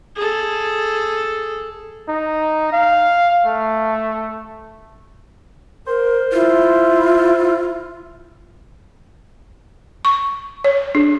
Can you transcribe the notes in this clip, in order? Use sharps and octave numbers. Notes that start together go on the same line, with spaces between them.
G#4 A4
D#4
F5
A3
A#4 C5
E4 F4
C#6
C#5
D4